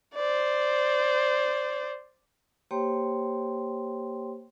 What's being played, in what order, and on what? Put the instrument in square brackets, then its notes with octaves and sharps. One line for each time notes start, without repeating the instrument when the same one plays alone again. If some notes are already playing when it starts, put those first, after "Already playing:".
[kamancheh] C5 D5
[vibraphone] A#3 G4 C5 C#5 G5 C6